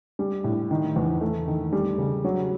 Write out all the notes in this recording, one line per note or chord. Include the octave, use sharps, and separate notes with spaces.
G3
A2
D#3
E2
A3
D#3
G3
C#3
F#3